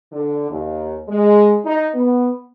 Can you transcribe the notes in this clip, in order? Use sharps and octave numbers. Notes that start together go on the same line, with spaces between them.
D3
D#2
G#3
D#4
B3